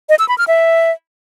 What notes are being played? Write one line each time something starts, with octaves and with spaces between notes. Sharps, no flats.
D#5
E6
B5
F6
E5